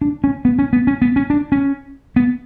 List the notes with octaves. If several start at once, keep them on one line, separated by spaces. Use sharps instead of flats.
D4
C#4
B3
C#4
B3
C#4
B3
C#4
D4
C#4
B3